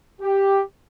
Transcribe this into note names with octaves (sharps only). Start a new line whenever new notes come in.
G4